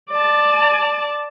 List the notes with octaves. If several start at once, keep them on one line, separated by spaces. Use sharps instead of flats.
D5 A5